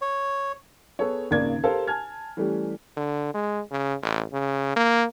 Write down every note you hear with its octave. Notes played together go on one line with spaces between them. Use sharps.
C#5
B3 G#4 A4 B4 C#5
G#1 D#2 C#3 A#3 D5 G#6
G4 A4 A#4 C5 F5
G#5 A5 F6 G#6
E3 G3 A3 C#4 G4
D3
G#3
C#3
A1
C#3
A#3